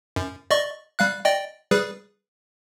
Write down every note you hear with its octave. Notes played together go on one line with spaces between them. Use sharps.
F#2
D5 D#5 C#6
G3 F5 F#6
D5 D#5 G5
G3 G#4 B4